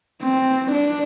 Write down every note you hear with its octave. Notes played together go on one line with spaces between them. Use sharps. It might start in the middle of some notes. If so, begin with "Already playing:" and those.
C4
D4